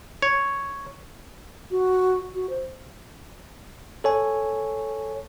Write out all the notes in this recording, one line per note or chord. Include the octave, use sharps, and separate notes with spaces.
C#5
F#4
F#4
C5
A4 C#5 G#5